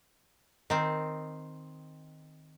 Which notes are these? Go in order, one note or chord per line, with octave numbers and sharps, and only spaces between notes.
D#3 C4